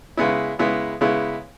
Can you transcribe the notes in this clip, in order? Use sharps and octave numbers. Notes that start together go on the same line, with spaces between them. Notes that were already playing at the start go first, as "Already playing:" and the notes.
C#3 G#3 B3 E4
C#3 G#3 B3 E4
C#3 G#3 B3 E4